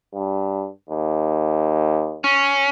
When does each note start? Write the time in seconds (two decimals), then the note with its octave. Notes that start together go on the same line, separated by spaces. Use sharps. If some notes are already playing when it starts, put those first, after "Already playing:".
0.14 G2
0.89 D#2
2.24 C#4